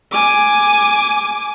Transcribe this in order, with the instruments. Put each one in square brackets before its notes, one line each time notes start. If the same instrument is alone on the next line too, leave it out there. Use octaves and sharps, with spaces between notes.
[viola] G#5 D6